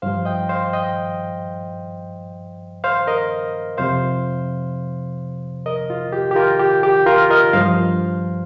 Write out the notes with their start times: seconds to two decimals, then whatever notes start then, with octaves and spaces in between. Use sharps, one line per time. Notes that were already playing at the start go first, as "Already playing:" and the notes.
0.02 G2 F3 C5 F5
0.25 D#5 G5
0.49 C5 F5
0.73 D#5 G5
2.84 C5 F5
3.07 A#4 D#5
3.77 F2 C3 F3 C5 F5
5.66 A#4 D#5
5.90 F4
6.12 G4
6.31 G4
6.36 F4 A#4
6.59 G4
6.83 G4
7.06 F4 A#4
7.30 A#4 D#5
7.53 G2 F3 C5 F5